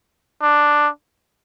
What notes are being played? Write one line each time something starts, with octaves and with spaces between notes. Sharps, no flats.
D4